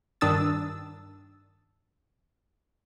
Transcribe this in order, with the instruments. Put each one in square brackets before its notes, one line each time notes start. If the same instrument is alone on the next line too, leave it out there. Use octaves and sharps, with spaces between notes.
[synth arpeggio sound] G2 D#3 D4 D#6 E6 A6